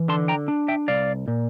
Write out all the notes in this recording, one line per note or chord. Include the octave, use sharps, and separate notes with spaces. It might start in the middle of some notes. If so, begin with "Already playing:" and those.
Already playing: E3
D3 A5 C6
G5 A#5
D4
E5 G5
C2 D5 F5
A#2